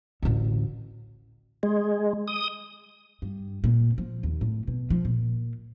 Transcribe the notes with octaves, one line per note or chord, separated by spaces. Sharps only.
A1 D2
G#3
D#6
G2
A#2
F3
D#2
A2
B2
F3
A#2